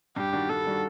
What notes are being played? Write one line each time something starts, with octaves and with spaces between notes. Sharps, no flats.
G2 G4
D#3 G3 D4 F#4
G2 A4
D#3 G3 D4 F#4